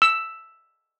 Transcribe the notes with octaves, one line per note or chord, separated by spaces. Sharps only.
E6